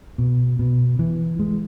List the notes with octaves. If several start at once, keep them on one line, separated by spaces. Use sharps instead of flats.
B2
B2
E3
G#3